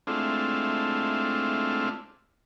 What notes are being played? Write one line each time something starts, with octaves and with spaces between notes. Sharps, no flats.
G#3 A3 C4 D4 E4 F4